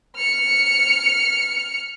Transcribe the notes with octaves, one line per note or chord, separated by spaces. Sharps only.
F6 C#7